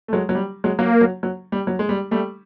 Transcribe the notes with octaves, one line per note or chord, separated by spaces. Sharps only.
A3
F#3 G#3
F#3
G3
F#3 G#3
F#3 A#3
F#3
F#3
G3
F#3
G#3
G3
G3 A3